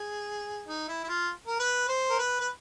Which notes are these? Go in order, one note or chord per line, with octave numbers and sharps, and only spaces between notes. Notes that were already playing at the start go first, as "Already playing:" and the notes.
Already playing: G#4
D#4
E4
E4
F4
A#4
B4
C5
A#4
B4
B4